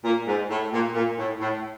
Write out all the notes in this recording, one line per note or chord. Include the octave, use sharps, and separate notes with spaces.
A#2
G#2
A2
A#2
A#2
A2
A2